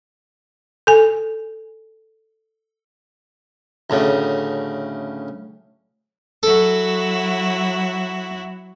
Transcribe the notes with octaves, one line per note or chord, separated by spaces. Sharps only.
A4 G#5
D2 A2 C#3
F#3 E4 F#4 A4